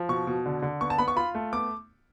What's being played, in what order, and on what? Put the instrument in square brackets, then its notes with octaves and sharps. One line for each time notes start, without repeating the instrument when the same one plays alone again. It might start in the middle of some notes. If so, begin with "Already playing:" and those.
Already playing: [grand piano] F3
[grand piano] B2 [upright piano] C#6
[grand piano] B2
D3
D3
[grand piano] B3 [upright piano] C#6
[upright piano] A5
[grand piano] B3 [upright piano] B5
[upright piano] C#6
[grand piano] F4 [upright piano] B5
[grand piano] A3
[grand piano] B3 [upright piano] D6